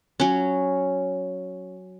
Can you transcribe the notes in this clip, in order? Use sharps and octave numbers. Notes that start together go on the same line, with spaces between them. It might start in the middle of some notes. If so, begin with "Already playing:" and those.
F#3 C#4